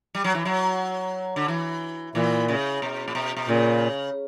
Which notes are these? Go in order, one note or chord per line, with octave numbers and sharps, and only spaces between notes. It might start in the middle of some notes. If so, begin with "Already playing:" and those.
G3
F#3
E3
F#3
D3
E3
A#2 E3
C#3
B2
A#2
B2
B2
A#2 C#3